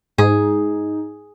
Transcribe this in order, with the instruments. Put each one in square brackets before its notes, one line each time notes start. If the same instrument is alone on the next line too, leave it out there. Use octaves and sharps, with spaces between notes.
[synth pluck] G#2 [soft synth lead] D#4 [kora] G#4